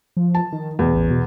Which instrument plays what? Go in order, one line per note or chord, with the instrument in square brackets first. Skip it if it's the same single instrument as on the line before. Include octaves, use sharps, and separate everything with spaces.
[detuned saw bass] F3
[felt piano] A5
[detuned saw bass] D#3
[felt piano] E2 [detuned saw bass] B2
[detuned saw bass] A1
B2